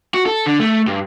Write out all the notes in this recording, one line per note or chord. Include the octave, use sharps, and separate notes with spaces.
F#4
A4
D3
A3
G2